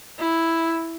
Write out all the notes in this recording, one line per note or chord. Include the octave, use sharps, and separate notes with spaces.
E4